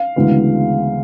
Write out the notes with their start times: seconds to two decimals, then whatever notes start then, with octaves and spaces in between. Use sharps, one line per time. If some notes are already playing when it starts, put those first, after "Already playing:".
Already playing: F5
0.16 D2 C#3 E3 G#3 B3